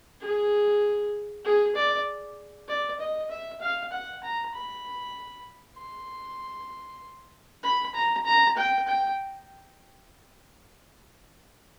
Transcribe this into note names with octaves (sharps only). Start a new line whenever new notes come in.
G#4
G#4
D5
D5
D#5
E5
F5
F#5
A#5
B5
C6
B5
A#5
A#5
G5
G5